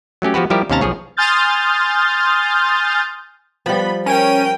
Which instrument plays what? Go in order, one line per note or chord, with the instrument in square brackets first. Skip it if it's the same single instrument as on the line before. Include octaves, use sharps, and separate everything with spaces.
[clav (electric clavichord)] F#3 A3 C#4 G4
F3 B3 F#4 G4 B4
F3 G3 E4 G4 A#4
D#2 C3 C#4 F5 A5 A#5
B1 F3 G#4 C#5
[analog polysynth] G#5 C6 D#6 F6 G6 A6
[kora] F3 G3 [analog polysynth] B3 B5
[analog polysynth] C#4 D#7 [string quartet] A#4 G5